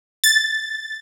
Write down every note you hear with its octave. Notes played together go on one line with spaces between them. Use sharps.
A6